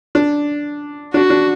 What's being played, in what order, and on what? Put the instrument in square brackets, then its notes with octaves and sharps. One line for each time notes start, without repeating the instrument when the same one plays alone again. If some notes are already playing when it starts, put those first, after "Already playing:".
[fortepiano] D4
[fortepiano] D4 [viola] F#4
[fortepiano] D4